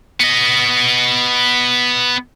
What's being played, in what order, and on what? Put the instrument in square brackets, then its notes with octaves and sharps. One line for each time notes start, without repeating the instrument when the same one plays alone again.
[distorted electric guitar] B3 D#5